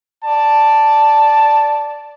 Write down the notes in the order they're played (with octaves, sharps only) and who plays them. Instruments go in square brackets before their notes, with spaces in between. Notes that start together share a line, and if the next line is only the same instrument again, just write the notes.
[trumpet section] D5 A5